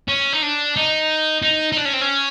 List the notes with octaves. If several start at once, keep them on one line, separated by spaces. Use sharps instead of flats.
C#4
D#4
D4
D#4
D#4
D#4
D4
C#4
C4
C#4